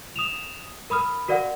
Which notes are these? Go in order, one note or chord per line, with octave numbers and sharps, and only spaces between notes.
D#6 E7 F7
A#4 B5 D#6 F6
F#4 A#4 D5 F5 F#5